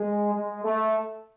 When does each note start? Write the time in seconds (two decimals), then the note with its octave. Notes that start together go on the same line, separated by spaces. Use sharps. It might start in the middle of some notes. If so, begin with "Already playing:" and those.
Already playing: G#3
0.34 G#3
0.64 A3